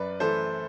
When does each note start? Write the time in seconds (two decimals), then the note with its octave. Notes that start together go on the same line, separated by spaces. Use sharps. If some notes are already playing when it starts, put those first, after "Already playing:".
Already playing: F#2 B4 D5
0.20 E3 A3 A4 C5